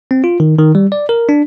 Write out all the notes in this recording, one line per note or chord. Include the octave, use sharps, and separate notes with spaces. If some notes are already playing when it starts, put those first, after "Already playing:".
C4
F4
D#3
D#3
G3
D5
A#4
D4